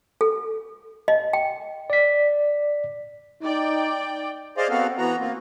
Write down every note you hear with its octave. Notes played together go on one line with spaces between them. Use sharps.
A4
D#5
G5
D5 B6
D#4 D5 G5
G#4 C5 D5 D#5 F5
B3 C4 F#4 A4 F5
E3 B3 F#4 A#5
A#3 C4 F4